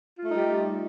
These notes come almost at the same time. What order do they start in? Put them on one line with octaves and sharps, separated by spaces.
F4 A3 D#4 G3 G4